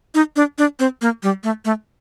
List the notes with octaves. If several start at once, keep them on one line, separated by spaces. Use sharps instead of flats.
D#4
D4
D4
C4
A#3
G3
A3
A3